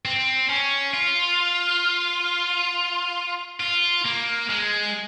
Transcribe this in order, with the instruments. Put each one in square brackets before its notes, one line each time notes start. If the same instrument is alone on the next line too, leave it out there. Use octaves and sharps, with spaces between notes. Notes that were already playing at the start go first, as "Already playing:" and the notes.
[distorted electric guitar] C4
C#4
F4
F4
A#3
G#3